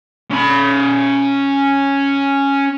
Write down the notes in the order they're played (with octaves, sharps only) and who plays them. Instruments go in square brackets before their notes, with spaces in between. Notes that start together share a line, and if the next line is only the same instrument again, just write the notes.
[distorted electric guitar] C#4 B5